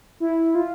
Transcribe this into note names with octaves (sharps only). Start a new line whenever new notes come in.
E4
F4